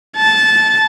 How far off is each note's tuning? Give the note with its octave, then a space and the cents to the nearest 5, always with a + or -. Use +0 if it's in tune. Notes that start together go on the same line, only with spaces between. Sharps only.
A5 -15